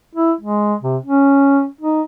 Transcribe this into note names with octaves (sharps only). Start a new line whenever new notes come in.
E4
G#3
C3
C#4
D#4